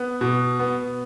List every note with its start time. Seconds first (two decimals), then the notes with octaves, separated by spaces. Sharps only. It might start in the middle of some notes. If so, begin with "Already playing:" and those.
Already playing: B3
0.21 B2
0.59 B3